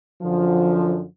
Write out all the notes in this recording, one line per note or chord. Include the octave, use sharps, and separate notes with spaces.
F#2 D3 F3